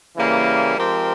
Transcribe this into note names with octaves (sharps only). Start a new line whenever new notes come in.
C#3 E3 G3 A#3
F3 G#3 C4 G4 A#4